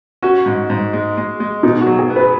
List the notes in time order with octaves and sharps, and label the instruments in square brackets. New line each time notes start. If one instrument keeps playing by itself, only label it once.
[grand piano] C#4 [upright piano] F#4
[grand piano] G#2
G#2
G#3
G#3
G#3
[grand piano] B2 [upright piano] D#4
[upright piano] F#4
[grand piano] F#3
[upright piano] G#4
[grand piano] B3
[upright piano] B4